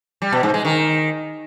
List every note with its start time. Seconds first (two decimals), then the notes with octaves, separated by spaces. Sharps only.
0.22 G3
0.32 B2
0.43 G#2
0.54 G#3
0.65 D#3